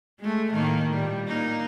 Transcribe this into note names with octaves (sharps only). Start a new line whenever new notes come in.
G#3 A3
A2 D#3 A#3
A#2 G3
A#3 D#4